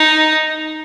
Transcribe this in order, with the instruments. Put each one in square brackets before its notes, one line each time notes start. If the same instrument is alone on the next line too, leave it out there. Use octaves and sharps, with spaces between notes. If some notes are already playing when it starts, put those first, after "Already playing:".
Already playing: [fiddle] D#4